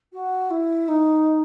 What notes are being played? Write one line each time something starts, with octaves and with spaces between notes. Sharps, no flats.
F#4
E4
D#4